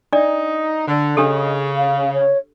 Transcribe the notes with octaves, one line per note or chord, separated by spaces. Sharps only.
D4 D#4 D5
D3
C#3 D4 G4 A4 D#5
F5
C#5